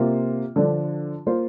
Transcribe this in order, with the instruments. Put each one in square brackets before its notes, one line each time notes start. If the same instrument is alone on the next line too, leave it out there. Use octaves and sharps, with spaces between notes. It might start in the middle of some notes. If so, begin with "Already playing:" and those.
Already playing: [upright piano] C3 A#3 F4
D3 F3 D4
A#3 F4 C5